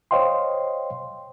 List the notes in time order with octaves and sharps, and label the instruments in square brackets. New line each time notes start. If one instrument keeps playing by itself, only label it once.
[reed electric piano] C5 C#5 D#5 F5 G5 C6